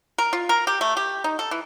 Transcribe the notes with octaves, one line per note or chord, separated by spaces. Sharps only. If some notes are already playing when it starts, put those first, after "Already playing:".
A#4
F4
A#4
G4
A3
G4
D#4
A4
E3